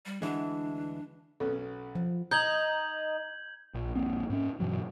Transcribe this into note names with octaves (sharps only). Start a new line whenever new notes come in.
G3
D2 E3 G#3 D4
B1 B3 C#4 A4
F3
D#4 G6 G#6 F#7
A#1
D#1 A#1 A#3 C4
G#2 C#4
G2 B2 E3 F#3